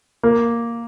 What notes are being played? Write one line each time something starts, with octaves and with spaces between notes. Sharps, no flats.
A#3